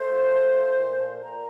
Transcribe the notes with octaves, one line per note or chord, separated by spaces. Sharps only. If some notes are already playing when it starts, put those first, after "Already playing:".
Already playing: A3 C5
F3
A3
F3
A#2
A#2
A#2 A#5